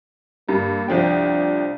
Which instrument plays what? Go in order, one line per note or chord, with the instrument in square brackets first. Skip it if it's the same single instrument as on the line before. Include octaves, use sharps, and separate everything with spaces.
[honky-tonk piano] G2 [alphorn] A#3
[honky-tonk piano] C2 F3 G5 [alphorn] D4